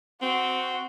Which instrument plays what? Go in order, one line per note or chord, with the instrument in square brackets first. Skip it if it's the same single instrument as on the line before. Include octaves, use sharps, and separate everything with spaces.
[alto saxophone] C4 [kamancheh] F#4